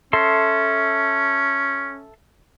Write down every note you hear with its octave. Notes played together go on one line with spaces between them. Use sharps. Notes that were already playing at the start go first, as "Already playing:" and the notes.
C#4 A4 E5 C6